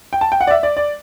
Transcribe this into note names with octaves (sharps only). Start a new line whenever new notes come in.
G5
A5
G5
F#5
D5
E5
D5
D5